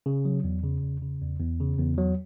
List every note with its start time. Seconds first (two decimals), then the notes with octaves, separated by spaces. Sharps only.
0.06 C#3
0.25 F#3
0.44 E2
0.64 C#3
0.83 E2
1.02 C#3
1.22 E2
1.40 E2
1.60 C#3
1.79 E2
1.98 F#3